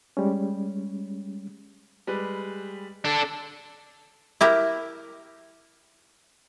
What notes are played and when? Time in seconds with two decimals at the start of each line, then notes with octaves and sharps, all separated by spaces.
0.17 G3 G#3 C#4
2.07 G3 G#3 B4
3.05 D4 A4
4.41 E4 G4 A#4